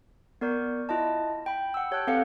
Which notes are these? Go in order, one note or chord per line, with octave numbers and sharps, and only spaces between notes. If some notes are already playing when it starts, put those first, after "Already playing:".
B3 A#4 D5 C#6 G6
E4 F4 D#5 A5
G5 B5
F#5 E6
G4 C#5 G5 A5 F#6 G6
C4 A4 B4 F5 F#5 C#7